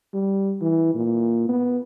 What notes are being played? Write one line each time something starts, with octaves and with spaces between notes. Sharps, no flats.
G3
E3
A#2
B3